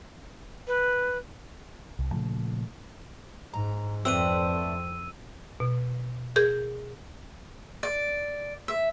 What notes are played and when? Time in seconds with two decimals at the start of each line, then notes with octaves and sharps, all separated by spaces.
0.67 B4
1.99 C2
2.12 A#2 C#3 F3 A3
3.54 G#2 A#5
4.05 F2 A3 C4 D4 B4 E6 D#7
5.60 B2
6.36 G#4 A#4 G6
7.83 D5
8.68 E5